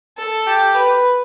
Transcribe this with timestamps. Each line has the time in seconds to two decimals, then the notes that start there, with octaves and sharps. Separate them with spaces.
0.18 A4
0.47 G4
0.75 B4